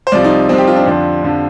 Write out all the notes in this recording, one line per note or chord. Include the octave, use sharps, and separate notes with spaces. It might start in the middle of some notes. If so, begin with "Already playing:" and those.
C5
C2 C3 F3 D5
D#4
C2 C3 F3 C4
G4
F4
D4
F2 D3 F3
F2 D3 F3